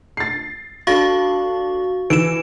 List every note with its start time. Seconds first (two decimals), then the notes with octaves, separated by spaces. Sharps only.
0.17 A6 C7
0.87 D4 F#4 A4 F5 C#6
2.10 E3 D7 E7